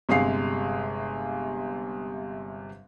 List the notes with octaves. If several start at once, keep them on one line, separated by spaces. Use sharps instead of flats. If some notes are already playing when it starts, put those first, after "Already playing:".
G1 C3 G#3 G#4 F5 C7